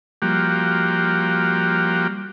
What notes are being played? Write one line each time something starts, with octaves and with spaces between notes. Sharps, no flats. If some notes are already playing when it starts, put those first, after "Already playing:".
F3 G3 A#3 F#4 G4